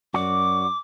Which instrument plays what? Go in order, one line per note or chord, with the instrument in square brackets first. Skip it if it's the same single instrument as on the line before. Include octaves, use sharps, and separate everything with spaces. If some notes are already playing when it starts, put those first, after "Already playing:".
[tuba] F#2 [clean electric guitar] F#4 D5 [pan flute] D6